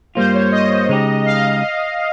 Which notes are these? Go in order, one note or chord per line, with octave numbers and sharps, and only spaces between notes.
G2 G3 A#3 F4 C5
C#5
D#5
C#3 G#3 D#4 G4
F5
D#5